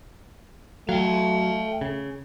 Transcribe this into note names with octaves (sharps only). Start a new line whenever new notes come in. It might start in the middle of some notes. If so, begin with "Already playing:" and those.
F#3 A3 F5 G5
C#3